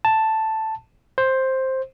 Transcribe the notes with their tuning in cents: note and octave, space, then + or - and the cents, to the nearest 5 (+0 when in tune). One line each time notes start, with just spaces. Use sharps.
A5 +0
C5 +10